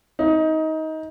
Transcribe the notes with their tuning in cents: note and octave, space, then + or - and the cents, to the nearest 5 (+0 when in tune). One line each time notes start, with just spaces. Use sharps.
D#4 +20